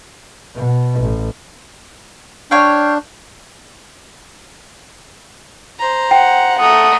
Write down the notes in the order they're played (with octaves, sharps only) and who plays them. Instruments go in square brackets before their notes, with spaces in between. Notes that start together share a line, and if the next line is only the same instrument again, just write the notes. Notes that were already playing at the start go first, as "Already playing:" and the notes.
[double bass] B2
A1
[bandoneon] D4 [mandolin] C#5 F5 G5
[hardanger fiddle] C5 A#5
[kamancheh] F#5 [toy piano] G5
[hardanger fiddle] A3 A#5 [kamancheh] F#5 D#6